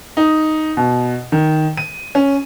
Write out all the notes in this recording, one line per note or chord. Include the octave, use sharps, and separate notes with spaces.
D#4
B2
D#3
D#7
C#4